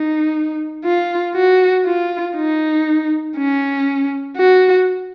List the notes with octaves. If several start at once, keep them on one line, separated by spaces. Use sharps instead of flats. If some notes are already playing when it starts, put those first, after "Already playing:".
Already playing: D#4
F4
F#4
F4
D#4
C#4
F#4